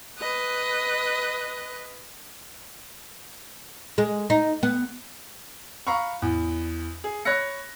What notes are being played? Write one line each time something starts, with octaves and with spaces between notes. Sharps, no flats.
B4 D#5 F#6
G#3
D#4
B3
F5 A#5 B5 C#6
E2
G#4
C#5 B5 F#6 A#6 C#7